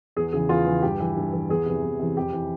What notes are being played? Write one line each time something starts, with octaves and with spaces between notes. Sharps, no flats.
E2 G#4
C#3 E3 G#4
E2 F4
C#3 E3
G2 G4
E3
G2
E3
E2 G#4
C3 E3
E2
C3 E3
F2 G4
E3